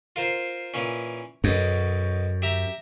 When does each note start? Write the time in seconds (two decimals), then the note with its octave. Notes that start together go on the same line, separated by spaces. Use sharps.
0.16 F4 A#4 C5
0.74 A#2 E3 C#4
1.44 B1 F#2 B2
2.42 G4 E5 A#5